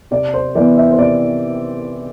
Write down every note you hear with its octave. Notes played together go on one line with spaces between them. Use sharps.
C3 D5
C5
E3 B3 D5
E5
C5
C3 D5